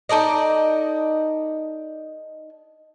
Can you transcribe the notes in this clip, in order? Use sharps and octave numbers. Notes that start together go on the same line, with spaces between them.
D#4 A4 D5 D#5